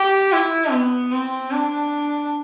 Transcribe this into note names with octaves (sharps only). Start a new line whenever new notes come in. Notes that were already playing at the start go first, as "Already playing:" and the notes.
Already playing: G4
E4
B3
C4
D4